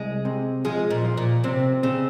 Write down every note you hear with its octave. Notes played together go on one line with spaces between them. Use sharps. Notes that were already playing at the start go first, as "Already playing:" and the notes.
Already playing: C2 G#3
C3
F3 G#3
A#2
F3
A#2
C3 C4
C#3 C4